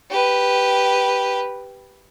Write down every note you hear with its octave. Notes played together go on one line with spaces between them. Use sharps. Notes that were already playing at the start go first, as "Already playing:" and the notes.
G4 B4